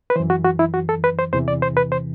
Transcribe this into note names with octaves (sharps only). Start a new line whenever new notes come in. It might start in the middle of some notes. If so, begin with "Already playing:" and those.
B4
F#2 E3 C5
F#4
F#4
E4
F#4
A4
B4
C5
E2 C3 E3 C5
D5
C5
B4
C5